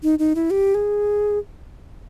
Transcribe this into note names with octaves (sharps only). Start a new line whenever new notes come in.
D#4
D#4
E4
G4
G#4